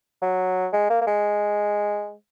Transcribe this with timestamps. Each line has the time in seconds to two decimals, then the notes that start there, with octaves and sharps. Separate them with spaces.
0.22 F#3
0.73 G#3
0.90 A#3
1.01 A#3
1.07 G#3